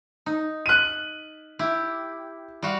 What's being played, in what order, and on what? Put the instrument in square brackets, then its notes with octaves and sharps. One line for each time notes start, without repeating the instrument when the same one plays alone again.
[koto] D#4
[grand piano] F#6 D#7
[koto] E4 G4
G3 F#4 F5